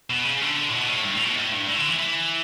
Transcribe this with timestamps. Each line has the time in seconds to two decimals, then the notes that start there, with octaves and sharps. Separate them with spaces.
0.10 B2
0.25 C#3
0.42 D3
0.69 A2
0.73 B2
0.88 A2
1.04 G2
1.15 A2
1.25 B2
1.35 A2
1.52 G2
1.67 A2
1.77 D3
1.88 E3
1.98 E3